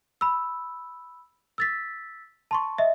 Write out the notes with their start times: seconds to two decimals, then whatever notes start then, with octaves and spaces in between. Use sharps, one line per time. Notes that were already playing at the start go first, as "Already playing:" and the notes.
0.21 B5 E6
1.58 E6 A6 B6
2.51 A5 C6 C#6
2.78 D#5 E5